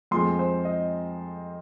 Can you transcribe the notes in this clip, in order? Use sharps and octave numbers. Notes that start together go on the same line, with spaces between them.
F2 F3 G#3 C6
C5
D#5